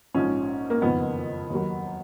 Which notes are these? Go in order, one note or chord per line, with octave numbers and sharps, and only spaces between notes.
A#1 G#2 F3 C#4
A#3
F#1 F2 D#3 B3
D#2 D#3 F#3